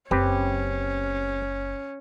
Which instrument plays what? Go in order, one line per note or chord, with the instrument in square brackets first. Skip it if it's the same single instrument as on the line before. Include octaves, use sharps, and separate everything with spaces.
[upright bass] F#1 [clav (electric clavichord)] C4 G4 B4 [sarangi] C#4